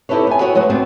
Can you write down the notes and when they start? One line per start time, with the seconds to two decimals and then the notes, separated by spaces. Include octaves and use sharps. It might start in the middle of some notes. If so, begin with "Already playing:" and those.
0.09 D#4 E4 G4 A4 B4 C#5
0.27 B3 G#5
0.40 B3 E4 F#4 G4 C#5
0.55 F#3 G#3 B4 C#5
0.70 B3 C4 D4 F#4